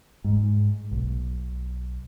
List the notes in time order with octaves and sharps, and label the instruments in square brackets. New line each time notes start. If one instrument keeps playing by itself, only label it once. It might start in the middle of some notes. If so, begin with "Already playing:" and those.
[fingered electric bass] G#2
B1